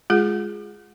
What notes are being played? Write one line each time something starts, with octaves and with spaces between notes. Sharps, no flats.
G#3 F4 G#4